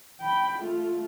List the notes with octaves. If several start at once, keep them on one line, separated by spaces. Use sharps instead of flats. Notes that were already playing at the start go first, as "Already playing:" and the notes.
G5 B5
A3 F4